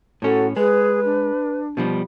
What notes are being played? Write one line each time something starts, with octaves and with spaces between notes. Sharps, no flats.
A2 C#4 F#4 A4
G#3 G#4 B4
D4
B2 F3 G3